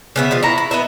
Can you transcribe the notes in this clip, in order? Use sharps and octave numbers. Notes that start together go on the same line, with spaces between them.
C#3 B3 E5
F3 G#3 F4
E4 C#5 A#5
B5
B3 D#5 E5